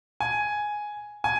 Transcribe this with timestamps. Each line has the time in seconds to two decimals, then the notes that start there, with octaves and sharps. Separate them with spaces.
0.20 G#5
1.24 G#5